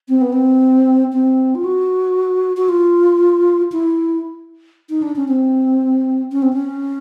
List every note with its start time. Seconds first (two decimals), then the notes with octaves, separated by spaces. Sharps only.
0.09 C4
0.21 B3
0.33 C4
1.13 C4
1.55 F4
1.64 F#4
2.57 F#4
2.69 F4
3.72 E4
4.90 D#4
5.02 D4
5.16 C#4
5.28 C4
6.32 C#4
6.42 C4
6.53 C#4